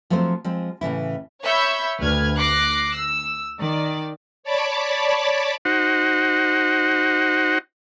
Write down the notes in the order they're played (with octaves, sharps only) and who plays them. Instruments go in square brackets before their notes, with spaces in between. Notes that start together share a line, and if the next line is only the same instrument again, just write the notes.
[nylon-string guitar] F3 F#3 A3 C4 C5
F3 G#3 C4
A2 C#3 E3 E4
[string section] C#5 E5 B5 C#6 E6 G6
D2 B4 F6 G#6
D6 F#6 A#6 C7
E6
D#3 D5
[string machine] C#5 D5 A5 B5 D6
[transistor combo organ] D#4 F#4 C5 F#5